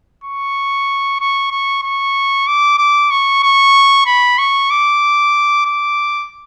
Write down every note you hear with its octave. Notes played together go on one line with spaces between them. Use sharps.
C#6
C#6
C#6
C#6
D6
D6
C#6
C#6
B5
C#6
D6
D6